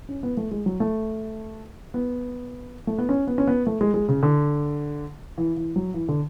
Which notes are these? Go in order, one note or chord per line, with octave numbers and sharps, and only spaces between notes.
C#4
B3
A3
G#3
F#3
A3
B3
A3
B3
C#4
B3
C#4
B3
A3
G#3
G#3
C#3
D3
E3
E3
F#3
E3
D3